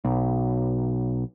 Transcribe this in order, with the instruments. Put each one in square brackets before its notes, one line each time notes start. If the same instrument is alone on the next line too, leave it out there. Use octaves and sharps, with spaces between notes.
[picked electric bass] B1